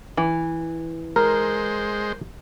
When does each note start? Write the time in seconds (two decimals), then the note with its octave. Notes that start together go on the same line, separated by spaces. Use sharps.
0.17 E3
1.16 G#3 A#4 C5